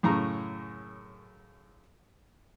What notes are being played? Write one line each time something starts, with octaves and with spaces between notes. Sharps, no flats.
F#2 A2 C#3 A#5